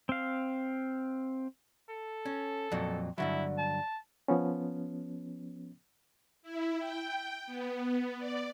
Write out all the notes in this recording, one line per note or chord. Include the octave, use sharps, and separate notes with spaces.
C4 F5
A4
C#4
F2 A#2 F#3
G2 D3 F#3 E4
A5
F3 B3 C#4
E4
G5
B3
D5